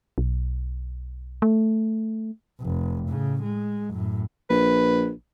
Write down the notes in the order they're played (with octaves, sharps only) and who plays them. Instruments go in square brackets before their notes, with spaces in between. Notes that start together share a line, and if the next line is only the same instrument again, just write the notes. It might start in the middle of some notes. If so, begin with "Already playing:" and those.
[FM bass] B1
A3
[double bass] F1
A2 C#3
G#3
F#2 A2
[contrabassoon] A#1 [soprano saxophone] B4